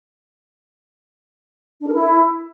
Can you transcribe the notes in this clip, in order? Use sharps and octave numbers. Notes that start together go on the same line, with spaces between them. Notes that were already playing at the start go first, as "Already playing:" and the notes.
D4
A#4
E4